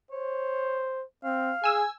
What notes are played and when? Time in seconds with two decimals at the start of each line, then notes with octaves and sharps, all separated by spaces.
0.11 C5 C#5
1.24 C4 F5
1.64 G#4 G#5 E6